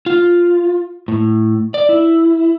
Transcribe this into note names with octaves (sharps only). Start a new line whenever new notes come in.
F4
A2
D5
E4